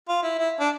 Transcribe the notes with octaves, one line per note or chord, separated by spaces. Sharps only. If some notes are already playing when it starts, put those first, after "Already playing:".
F4
E4
E4
D4